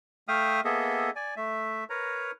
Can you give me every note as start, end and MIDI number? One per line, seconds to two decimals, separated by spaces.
0.28 0.61 57
0.28 0.61 76
0.28 0.61 77
0.28 0.61 79
0.28 0.61 87
0.28 0.61 89
0.65 1.10 58
0.65 1.10 59
0.65 1.10 68
0.65 1.10 69
0.65 1.10 75
0.65 1.10 76
1.16 1.34 74
1.16 1.34 80
1.37 1.84 57
1.37 1.84 76
1.90 2.32 70
1.90 2.32 71
1.90 2.32 73
1.90 2.32 82